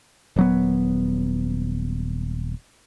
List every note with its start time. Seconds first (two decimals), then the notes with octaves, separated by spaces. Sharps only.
0.36 D#1 F#3 B3